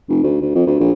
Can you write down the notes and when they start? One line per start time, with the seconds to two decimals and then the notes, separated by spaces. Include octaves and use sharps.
0.09 F1
0.23 D2
0.41 D2
0.55 F2
0.67 D2
0.79 A#1